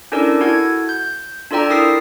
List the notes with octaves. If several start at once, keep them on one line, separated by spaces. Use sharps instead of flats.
C#4 D4 E4 A4 A#4 D5
E4 F#4 A4 F#5 G#6
G6
D4 F4 A4 D5 G5 A#5
E4 A#4 D#6 A6 B6 C7